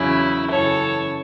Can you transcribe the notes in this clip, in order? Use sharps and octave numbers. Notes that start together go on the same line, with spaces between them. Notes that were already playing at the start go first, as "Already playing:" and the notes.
Already playing: E2 C#3 F#3 E4
F#2 C#3 E3 A4 C#5